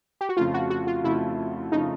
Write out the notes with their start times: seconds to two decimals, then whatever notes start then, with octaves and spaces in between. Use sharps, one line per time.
0.21 G4
0.29 F#4
0.37 F2 C#3 F3 A3 F4
0.54 F#4
0.70 F#4
0.87 F4
1.04 F2 C#3 F3 A3 E4
1.72 C#3 F3 A3 D#4